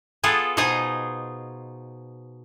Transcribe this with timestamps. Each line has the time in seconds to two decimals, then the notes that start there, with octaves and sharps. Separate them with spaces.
0.23 B3 F4 G#4 A4
0.57 B2 D#4 F4 G#4 C5 D#5